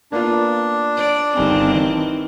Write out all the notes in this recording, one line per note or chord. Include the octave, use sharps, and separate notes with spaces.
A#3 B3 D4 F4
D5
G1 D#3 G3 C4 G#5
E3